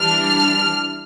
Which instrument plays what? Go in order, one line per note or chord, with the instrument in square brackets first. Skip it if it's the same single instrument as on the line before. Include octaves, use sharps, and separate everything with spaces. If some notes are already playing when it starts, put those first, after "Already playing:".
Already playing: [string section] E3 G3 D4 F6